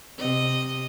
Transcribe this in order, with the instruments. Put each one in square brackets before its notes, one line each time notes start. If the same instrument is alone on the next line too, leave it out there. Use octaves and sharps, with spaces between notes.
[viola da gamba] C3 D#5